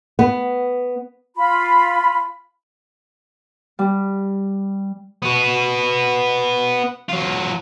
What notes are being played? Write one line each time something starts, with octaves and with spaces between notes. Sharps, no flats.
B3
F4 B5
G3
B3 F#4
F#3 F4